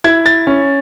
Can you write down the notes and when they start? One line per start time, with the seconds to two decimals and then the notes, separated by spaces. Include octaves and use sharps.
0.04 E4 G#6
0.26 A6
0.47 C#4